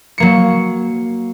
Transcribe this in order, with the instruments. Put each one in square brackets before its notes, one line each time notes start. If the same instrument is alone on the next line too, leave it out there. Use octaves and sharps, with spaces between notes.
[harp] F#3 A#3 C#7